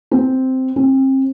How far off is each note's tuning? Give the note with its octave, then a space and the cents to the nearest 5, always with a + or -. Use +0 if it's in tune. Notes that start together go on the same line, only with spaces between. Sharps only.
C4 -5
C4 +35